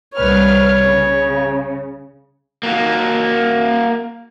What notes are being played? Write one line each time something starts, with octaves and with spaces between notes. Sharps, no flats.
C2 B4 C#5 F6
C#3
A#3 F#4